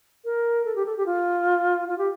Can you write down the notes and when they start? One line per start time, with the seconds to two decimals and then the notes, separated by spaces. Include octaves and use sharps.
0.25 A#4
0.65 A4
0.76 G4
0.85 A4
0.97 G4
1.06 F4
1.88 F4
1.98 G4